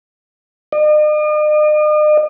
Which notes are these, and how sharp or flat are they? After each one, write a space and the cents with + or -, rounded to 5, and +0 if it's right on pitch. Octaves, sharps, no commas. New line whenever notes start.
D#5 -45